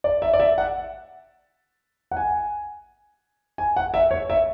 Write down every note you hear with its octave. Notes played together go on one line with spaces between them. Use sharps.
D5
E5
D5
E5
F#5
F#5
G#5
G#5
F#5
E5
C#5
E5